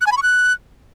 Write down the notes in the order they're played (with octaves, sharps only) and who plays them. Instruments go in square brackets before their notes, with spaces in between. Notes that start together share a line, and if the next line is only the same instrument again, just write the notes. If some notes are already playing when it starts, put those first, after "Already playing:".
[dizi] F#6
G#5
B5
C#6
F#6